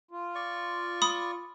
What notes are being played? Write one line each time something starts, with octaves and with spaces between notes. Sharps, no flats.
F4
D5 C#6
B5 D#6